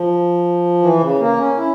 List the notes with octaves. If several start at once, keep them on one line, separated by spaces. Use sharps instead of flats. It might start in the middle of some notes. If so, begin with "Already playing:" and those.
Already playing: F3
E3
C#3
A#3
C#4
E4